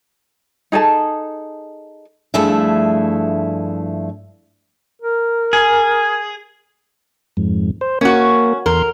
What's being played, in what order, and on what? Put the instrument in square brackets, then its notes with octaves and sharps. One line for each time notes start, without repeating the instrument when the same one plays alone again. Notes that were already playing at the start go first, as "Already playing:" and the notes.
[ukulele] D#4 G#4 A4 A5
[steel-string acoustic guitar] G2 F3 A3 E4 G#4 E5
[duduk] A#4
[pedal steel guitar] G#4
[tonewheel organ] F2 G#2
C5
[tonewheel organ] A#3 [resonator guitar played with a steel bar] C#4 F#4
[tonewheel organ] E2 C6 [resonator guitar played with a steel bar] A#4